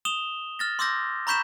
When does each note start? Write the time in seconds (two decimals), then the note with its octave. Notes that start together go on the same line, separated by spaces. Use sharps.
0.05 D#6 E7 F7 G7
0.59 F6 A6 A#6
0.79 C6 D6 E6 G6 A#6
1.27 A#5 B5 C#6 G6 B6 E7